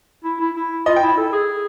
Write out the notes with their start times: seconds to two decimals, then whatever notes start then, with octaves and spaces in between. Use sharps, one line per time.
0.24 E4
0.40 E4
0.56 E4
0.86 F4 D#5
0.96 G5
1.02 E4
1.17 A4
1.33 G#4